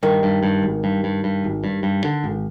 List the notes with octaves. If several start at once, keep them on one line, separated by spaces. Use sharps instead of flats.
G2 D#3
G2
G2
G#1
G2
G2
G2
G#1
G2
G2
D3
G#1